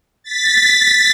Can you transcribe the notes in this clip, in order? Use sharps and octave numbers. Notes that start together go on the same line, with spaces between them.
A6 B6